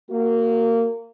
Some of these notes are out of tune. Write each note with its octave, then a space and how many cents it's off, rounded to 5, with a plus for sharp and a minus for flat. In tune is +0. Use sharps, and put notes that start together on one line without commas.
A#3 -20 F#4 +0